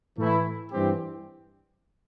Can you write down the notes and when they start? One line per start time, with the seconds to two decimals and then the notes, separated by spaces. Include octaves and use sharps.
0.17 A2 E3 A3 E4
0.71 G2 E3 G3 C4 G4